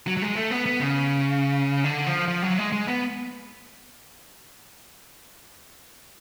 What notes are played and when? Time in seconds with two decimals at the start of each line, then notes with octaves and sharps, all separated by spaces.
0.07 F#3
0.17 F#3
0.22 G#3
0.36 A3
0.51 B3
0.66 B3
0.80 C#3
1.84 D3
2.07 F3
2.28 F3
2.43 F#3
2.59 G#3
2.72 G#3
2.87 B3